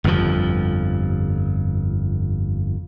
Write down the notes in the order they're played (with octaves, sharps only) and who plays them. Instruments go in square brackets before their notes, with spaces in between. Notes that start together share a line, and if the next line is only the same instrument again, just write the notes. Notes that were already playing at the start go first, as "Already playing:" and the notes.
[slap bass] G1 F2 A#2 F3